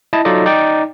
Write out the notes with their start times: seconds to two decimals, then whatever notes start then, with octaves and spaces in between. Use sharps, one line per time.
0.13 E4 D#5 A5
0.25 F#3 D#4 F4 A4 D5 D#5
0.46 D#4 D5 G5